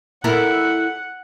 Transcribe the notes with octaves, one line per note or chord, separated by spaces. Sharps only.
E4 A4 A#4 F#5